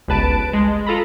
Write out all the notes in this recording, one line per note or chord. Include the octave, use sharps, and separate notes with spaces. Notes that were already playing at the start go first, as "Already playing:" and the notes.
G1 C#2 B4 A5 D7
G#3
F4 A4 A#5 B5